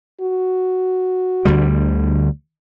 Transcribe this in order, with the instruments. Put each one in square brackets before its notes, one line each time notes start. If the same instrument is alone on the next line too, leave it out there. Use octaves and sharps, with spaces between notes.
[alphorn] F#4
[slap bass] D2 D3 G3